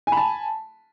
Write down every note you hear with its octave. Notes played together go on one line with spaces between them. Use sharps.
G#5 A5 B5